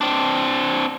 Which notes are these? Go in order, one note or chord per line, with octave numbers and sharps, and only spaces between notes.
C4 D4